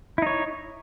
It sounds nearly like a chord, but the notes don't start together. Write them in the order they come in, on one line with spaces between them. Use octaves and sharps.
E4 D#4 C#5